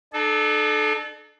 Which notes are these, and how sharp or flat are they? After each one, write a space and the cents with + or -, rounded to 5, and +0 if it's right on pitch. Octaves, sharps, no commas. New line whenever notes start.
D4 +45 A4 -25